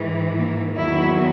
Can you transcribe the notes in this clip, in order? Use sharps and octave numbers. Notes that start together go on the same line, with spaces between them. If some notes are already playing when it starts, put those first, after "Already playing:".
Already playing: G#2 E3
A#3
E2 D#3 F#3 E4